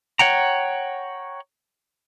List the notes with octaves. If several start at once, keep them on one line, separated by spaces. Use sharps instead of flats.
C#5 F#5 G5 A#5